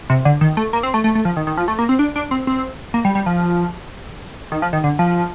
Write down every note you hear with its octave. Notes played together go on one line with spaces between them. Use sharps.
C3
D3
D#3
A3
A#3
C4
A3
A3
A3
F3
D#3
D#3
F3
A3
A#3
C4
D4
D4
C4
C4
A#3
G3
G3
F3
D#3
F3
D#3
D3
F3